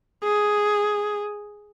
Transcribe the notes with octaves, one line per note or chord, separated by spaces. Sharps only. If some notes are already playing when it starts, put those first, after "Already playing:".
G#4